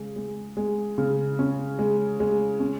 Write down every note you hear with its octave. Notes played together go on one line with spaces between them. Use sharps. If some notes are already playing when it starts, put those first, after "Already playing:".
Already playing: C#3 G#3
G#3
G#3
C#3
C#4
G#3
G#3
C#4